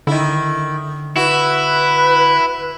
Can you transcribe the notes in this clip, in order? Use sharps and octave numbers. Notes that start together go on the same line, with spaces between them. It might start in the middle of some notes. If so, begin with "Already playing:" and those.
D3 D#3 E4
E4 F#4 B4